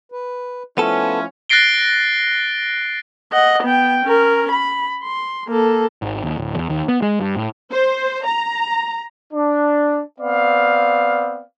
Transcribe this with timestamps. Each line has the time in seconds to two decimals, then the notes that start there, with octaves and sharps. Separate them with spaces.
0.12 B4
0.78 F3 A3 B3 C#4 E4 A4
1.49 F#6 A6 A#6 C7 D7 G7
3.32 D#5 F#5
3.63 B3 G5
4.05 C#4 A#4
4.51 B5
5.04 C6
5.48 A#3 A4
6.02 G#1
6.24 D#2
6.37 D1
6.55 E2
6.70 D#2
6.88 B3
7.02 G#3
7.21 G2
7.36 A2
7.71 C5
8.25 A#5
9.33 D4
10.20 B3 C4 D5 F5